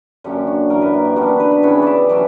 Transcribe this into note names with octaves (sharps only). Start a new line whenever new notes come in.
F#2 D3 A#3 C#4 G4
F#4
F#2 E3 A#3 A#4
B4
A#4
G4
D3 G3 B3 D4 F#4
G4
B4
B4
C#3 E3 B3 C#5
D5 E5
D3 F#3 C#4 D5